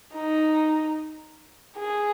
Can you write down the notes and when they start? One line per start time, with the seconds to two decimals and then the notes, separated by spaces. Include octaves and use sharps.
0.15 D#4
1.77 G#4